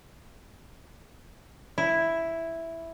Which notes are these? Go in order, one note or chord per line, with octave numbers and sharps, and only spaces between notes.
E4